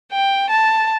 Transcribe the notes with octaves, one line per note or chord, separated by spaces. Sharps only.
G5
A5